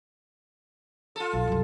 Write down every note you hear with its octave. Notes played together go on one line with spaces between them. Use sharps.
F4 A4
B1
C2 F#2